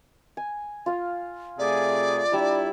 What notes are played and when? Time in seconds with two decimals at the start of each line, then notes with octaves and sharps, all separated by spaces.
0.37 G#5
0.86 F4 F5
1.59 C3 A3 G#4 D5
2.32 G3 D4 E4 A#5